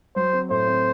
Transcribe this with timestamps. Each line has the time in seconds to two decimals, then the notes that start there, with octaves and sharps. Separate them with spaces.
0.16 F#3 C5
0.33 C4
0.50 A2 C5
0.68 C4